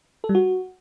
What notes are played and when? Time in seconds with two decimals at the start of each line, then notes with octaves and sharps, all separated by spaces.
0.24 A4
0.29 G3
0.35 F#4